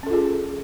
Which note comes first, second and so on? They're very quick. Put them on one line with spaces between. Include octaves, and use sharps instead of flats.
C#4 A4 F4 G#4